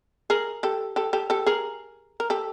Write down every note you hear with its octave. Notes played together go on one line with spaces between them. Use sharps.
G#4 A#4
G4 A4
G4 A4
G4 A4
G4 A4
G#4 A#4
A#4
G4 A4